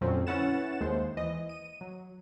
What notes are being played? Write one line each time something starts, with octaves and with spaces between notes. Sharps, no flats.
F2 A#2 D3 F#3 C4 C#4
C#4 E4 B4 F#5 A6 E7
D#2 G#3 A#3 C5
E3 D#5
D#7
F#3